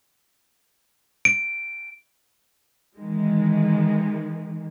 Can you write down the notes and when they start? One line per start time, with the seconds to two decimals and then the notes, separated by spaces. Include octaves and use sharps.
1.25 D7
2.97 D#3 E3 G#3